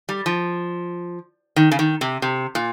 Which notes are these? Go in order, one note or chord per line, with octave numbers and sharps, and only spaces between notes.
G3
F3
D#3
C#3
D#3
C3
C3
A#2